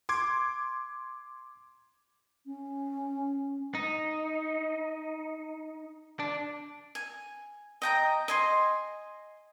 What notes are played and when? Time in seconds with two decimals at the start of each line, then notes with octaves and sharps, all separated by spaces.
0.09 C6 D6 G#6
2.46 C#4
3.75 D#4
6.20 D4
6.95 G#5
7.82 D#5 G5 A#5
8.28 D#5 G#5 C6